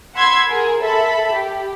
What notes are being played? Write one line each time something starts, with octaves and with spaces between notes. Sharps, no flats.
F#5 B5 C6 E6 G#6
G#4 A#4
A4 E5 B5
G4